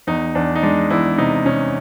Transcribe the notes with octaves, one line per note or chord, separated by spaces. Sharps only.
E2 D#4
E2 D4
D#4
G#3 D4
E2 E4
C3 D#4
C3 C#4